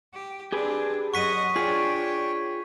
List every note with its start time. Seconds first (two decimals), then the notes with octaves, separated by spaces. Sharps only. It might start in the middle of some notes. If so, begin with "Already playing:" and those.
0.13 G4
0.52 C4 D4 G4 G#4 B4
1.14 F#2 D#5 F#5 C#6 B6 D#7
1.56 D4 F4 G#4 C#5 G5 B6